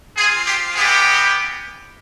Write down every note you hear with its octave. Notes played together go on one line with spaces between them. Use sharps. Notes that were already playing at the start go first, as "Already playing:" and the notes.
C4 F4 G#4
G4
G#3 B3 E4 G4 G#4